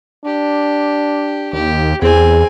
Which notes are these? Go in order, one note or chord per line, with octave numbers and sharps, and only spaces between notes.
D4 G4
D#2 G4
E2 C4 G#4 G#5